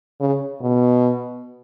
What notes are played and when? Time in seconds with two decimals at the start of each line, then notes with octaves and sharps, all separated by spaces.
0.20 C#3
0.61 B2